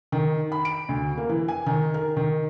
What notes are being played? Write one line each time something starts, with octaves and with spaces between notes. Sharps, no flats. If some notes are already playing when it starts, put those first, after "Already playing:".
D#3
B5
D7
D2
A#3
E3
G#5
D#3
A#4
D#3